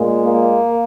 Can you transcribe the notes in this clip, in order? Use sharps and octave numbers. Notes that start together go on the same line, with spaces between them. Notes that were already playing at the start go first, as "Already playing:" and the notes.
Already playing: A#2 G#3
A#3